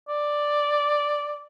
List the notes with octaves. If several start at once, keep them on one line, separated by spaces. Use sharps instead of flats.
D5